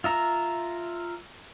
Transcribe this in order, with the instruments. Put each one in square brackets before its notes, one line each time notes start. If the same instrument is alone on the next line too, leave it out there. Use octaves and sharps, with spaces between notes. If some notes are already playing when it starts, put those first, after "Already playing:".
[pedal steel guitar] F4 E5 A#5